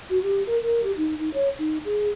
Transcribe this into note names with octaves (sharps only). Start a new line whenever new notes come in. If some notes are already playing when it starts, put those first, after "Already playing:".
F#4
G4
A#4
A#4
G4
D#4
D#4
C#5
D#4
G#4